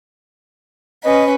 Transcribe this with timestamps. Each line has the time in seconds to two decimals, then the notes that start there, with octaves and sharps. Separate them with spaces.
1.04 C#4 B4 D#5